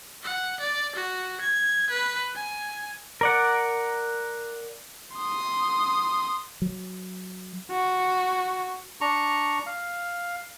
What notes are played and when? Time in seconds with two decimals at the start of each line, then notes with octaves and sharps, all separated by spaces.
0.23 F#5
0.60 D5
0.96 F#4
1.41 G#6
1.90 B4
2.35 G#5
3.21 A#4 D5 F#5
5.17 C6 D#6
6.62 F#3
7.71 F#4
9.01 D4 A#5 C#6
9.66 F5